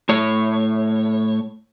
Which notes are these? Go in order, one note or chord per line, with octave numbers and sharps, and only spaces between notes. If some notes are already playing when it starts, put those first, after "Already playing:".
A2 C#5